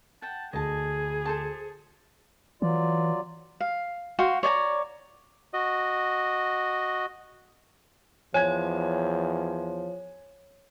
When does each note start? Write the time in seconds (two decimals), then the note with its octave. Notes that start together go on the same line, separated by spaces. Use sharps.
0.22 F#5 G5 A5
0.53 D2 G#4 D#5 G#5 A5
1.25 A4 C5 A5
2.62 E3 F#3 F4 D5
3.60 F5
4.19 F#4 F5 G5 C6
4.43 C#5 D5 G#5 A#5
5.53 F#4 D#5
8.34 E2 F3 C#5 G#5 G#6